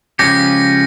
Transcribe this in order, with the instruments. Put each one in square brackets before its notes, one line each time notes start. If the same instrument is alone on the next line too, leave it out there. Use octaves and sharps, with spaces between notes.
[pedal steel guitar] C#3 F3 G#3 C#4 G4 [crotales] A#6 C#7